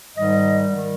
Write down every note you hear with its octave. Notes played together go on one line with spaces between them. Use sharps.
G#2 D#3 G3 D#5
D#3 G3